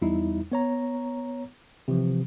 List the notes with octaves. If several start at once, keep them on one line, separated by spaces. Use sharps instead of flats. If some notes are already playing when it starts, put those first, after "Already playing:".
E2 G3 D#4 E4
B3 C#5 A#5
C3 E3 F3